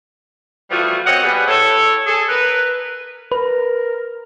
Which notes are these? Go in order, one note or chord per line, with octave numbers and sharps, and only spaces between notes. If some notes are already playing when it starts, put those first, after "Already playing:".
E3 F3 G3 A3 F4 F#4
F#2 C4 C#5 D#5 F#5
G3 B3 G#4
E4 A4 C#5
G#4 A4
A#4 B4
A#4 B4